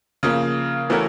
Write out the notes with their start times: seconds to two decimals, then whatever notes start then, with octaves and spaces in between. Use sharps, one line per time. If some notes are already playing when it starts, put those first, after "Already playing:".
0.23 C#3 F3 A#3
0.90 E3 A3 C#4 F#4 A#4